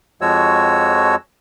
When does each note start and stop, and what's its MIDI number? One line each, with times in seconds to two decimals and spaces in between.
0.21 1.15 41
0.21 1.15 53
0.21 1.15 56
0.21 1.15 66
0.21 1.15 73
0.21 1.15 88